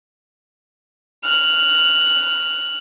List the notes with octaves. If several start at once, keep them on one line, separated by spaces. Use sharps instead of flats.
F6 F#6